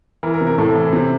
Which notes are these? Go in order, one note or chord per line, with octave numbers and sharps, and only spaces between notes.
E3 A#4
A#4
C3
A#4
A2 A4
E3
C3